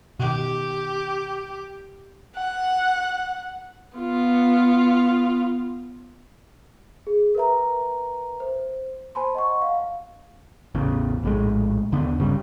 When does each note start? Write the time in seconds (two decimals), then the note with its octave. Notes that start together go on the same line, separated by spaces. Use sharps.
0.19 B2 D#3 G4
2.36 F#5
3.97 B3 F4
7.07 G#4
7.35 A#4 B4 E5 A#5
8.40 C5
9.15 C5 G#5 A5 B5 C6
9.35 D#5 F#5 C#6
9.62 F5
10.75 A1 E2 C#3
11.23 A#1 A2 G#3
11.92 D#2 D3 B3
12.19 G1 C#3 G3